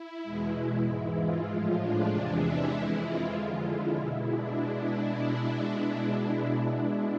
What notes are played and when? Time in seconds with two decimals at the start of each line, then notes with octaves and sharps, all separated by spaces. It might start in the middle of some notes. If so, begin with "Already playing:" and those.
Already playing: E4
0.23 E2 B2 G#3
0.85 G#2 E3 G#3
1.16 F4
1.47 A2 F3 G#3
1.78 D4
2.08 E2 C3 E3 G#3
2.40 E4
2.71 F2 E3 G#3
3.02 F4
3.33 F2 D3 G#3
3.64 E4
3.95 B2 G#3
4.26 D4